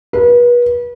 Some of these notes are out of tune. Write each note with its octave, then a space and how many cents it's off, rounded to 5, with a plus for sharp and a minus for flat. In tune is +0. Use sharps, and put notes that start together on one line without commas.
B4 -35